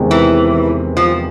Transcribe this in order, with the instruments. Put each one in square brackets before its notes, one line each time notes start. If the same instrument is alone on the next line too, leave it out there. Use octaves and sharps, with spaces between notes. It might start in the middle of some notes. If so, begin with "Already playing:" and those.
Already playing: [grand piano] E2 C3 D#3 G#3
[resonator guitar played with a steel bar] E3
F3